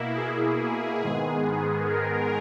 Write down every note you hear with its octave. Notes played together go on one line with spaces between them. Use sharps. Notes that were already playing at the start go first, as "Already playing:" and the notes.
Already playing: B2 A#3 E4
G#4
G#2 D#3 G#3 B3
A#4